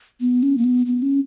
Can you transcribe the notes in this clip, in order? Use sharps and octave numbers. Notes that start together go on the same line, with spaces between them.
B3
C#4
A#3
B3
B3
C#4